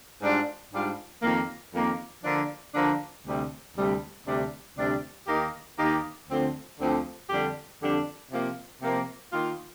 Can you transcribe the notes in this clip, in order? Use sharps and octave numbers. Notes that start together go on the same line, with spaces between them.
G#2 G3 D4 F4
G#2 G3 D4 F4
F2 D#3 A#3
F2 D#3 A#3
D3 F3 A#3 D4
D3 F3 A#3 D4
D2 C3 G3
D2 C3 G3
D2 C3 G3 D4
D2 C3 G3 D4
D#2 D#3 A#3 D#4 G4
D#2 D#3 A#3 D#4 G4
D2 D3 F3 C4
D2 D3 F3 C4
F2 D3 G3 D4 G4
F2 D3 G3 D4 G4
C3 F3 A#3
C3 F3 A#3
D#3 A#3 F4